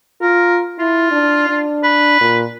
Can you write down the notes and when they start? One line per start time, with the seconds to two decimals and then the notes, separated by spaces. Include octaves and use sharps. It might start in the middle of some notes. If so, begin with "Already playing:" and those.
0.21 F4 A#4
0.79 E4 F4
1.12 D4
1.49 D4
1.83 B4
2.21 A#2